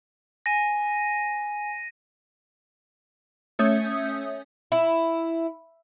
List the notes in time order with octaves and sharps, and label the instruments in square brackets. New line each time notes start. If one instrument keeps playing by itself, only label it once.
[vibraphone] G#5 [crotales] A#6 D#7
[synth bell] A3 C#4 C#5 E5 D#6 G6
[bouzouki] E4